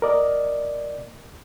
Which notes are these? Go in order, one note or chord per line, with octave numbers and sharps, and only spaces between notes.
A#4 D5 D#5